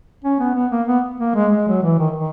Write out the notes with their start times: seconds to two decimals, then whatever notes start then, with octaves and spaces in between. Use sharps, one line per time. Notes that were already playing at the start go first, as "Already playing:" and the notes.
0.24 C#4
0.40 B3
0.55 B3
0.71 A#3
0.88 B3
1.20 A#3
1.35 G#3
1.52 G#3
1.68 F#3
1.83 E3
1.99 D#3
2.16 D#3